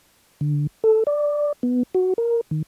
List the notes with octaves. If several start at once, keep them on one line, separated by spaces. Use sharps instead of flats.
D3
A4
D5
B3
F#4
A#4
D#3